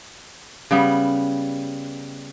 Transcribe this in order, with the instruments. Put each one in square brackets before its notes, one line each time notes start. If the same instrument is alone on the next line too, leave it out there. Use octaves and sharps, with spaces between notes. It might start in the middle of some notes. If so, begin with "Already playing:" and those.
[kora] C#3 G3 B3